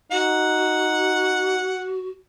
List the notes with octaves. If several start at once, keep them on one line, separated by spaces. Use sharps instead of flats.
D#4 F#4 F#5